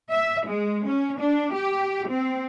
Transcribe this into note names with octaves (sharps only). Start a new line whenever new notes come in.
E5
G#3
C#4
D4
G4
C4